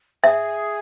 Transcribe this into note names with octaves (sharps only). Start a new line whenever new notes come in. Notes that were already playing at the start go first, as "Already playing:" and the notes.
G#4 E5